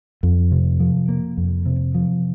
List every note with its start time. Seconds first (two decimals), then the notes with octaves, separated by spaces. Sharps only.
0.23 F2
0.52 C3
0.80 F3
1.09 A#3
1.37 F2
1.66 C3
1.95 F3